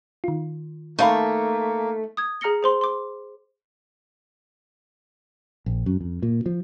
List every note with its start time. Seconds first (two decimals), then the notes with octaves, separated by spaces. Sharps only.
0.24 D#3 F4
0.99 A3 A#3 D#4 F5 B5
2.17 D#6 G#6
2.41 G#4 A#5 F6 A#6 C#7 G7
2.63 G#4 C5 C6
2.81 C6 D6
5.66 A#1
5.86 F#2
6.01 F2
6.23 A#2
6.46 F3